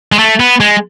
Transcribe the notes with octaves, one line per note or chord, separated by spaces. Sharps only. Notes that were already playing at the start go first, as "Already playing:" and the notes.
G#3
A3
B3
G#3